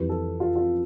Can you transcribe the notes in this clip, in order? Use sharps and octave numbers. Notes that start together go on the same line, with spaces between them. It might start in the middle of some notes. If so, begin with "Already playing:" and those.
Already playing: F2 E3 G3 B4
A4
F4
F4